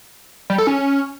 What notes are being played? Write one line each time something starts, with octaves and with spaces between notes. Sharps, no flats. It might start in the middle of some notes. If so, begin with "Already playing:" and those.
G3
A4
C#4